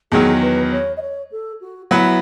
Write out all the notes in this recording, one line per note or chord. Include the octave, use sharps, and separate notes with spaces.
E2 D#3 F#3 G#4
B4
C#5
D#5
C#5
A4
F#4
F#3 B3 E4 F#4 B4